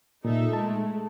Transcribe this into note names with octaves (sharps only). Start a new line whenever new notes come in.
A#2 D#4 A4 E5
G#3 A3 A5